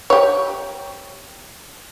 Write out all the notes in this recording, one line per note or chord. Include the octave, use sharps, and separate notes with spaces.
G4 C#5